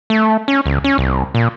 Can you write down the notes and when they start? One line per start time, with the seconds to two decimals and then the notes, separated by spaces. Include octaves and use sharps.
0.10 A3
0.48 C#4
0.66 C#2
0.84 C#4
0.98 C2
1.35 A#2